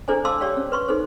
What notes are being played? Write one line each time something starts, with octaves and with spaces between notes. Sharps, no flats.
D4 E4 A4 C5 D5 G#5
C5 F5 A5 C6 D6 E6
G4 C#5 D5 F5 G5
C#4
B4 C6 C#6
D#4 A4 C5